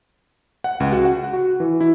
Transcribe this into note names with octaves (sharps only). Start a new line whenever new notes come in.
F#5
C#2
F#4
F#5
F#4
E3
E4